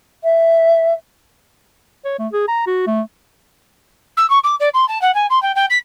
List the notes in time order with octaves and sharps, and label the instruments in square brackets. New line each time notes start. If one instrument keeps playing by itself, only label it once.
[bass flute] E5
[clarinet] C#5
A3
G#4
A#5
F#4
A3
[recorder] E6
C#6
D6
D5
C6
A5
F#5
G#5
C6
G5
G5
B6